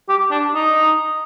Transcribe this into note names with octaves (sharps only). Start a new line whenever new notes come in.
G4
D4
D#4